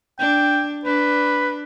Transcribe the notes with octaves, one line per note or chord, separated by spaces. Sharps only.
D4 G5
D4 B4